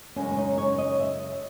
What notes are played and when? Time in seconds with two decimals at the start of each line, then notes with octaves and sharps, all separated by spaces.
0.16 F#2 C#3 G#3 C#4
0.32 C#4
0.37 D#4
0.58 C#5
0.78 D#5
0.99 E5